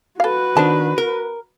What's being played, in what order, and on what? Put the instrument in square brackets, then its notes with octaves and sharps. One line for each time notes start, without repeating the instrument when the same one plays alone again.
[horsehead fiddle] F#4 B4 [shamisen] A4 F5
[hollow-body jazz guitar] D#3 D4 [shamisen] B3 C5 A5
[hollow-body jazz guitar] A#4